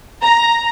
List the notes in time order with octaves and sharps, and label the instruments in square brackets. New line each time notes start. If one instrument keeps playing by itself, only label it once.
[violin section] A#5